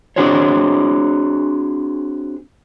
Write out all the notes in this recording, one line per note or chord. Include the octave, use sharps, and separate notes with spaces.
C4 D4 F#4 G#4 C5 C#5